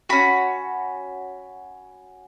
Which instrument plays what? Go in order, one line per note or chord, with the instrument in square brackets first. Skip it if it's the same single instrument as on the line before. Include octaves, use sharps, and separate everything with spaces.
[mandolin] C#4 F#4 B5